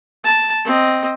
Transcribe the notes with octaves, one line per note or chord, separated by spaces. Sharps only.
A5
C4 D#5